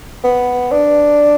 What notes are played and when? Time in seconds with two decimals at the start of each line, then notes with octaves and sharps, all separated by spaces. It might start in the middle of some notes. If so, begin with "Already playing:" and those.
0.24 B3
0.72 D4